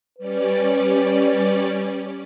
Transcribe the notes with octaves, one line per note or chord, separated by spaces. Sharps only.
G3 C#4 B4 D5